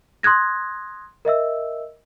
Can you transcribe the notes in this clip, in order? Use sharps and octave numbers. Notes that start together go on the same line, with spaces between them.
C6 D#6 F#6 G#6 A#6
A#4 D#5 E5 E6